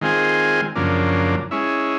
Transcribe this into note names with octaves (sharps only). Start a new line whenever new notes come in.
D#3 G#3 C4 F4 G#4
F#2 C#3 F3 A#3 D4
G#3 C#4 E4